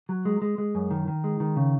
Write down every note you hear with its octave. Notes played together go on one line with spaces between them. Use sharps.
F#3
G#3
G#3
G#3
F#2
D#3
D#3
G#3
D#3
C#3